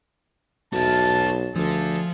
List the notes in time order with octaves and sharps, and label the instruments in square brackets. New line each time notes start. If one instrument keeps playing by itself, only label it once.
[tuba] B1 [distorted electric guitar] F#4 E5 [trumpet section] A5
[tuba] D2 [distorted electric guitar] F3 [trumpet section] D4 G#4 A4